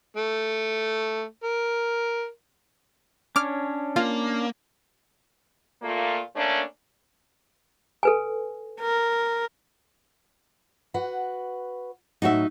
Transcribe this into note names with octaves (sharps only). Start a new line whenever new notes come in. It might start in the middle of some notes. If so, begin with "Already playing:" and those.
A3
A#4
C#4 D4 C#5 D6 F6
A#3 F4
A#2 A3 A#3 F4
A3 A#3 C#4 D4
A4 B4 G#5
A#4
F#4 B4 F#5
A2 F#3 D#4 F#4 E5